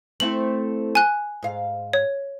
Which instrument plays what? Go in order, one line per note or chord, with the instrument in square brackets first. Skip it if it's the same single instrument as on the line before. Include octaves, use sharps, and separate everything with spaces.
[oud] A3 C4 E4 [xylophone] F#7
[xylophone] G#5 F#6
[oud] G#2 F5
[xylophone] C#5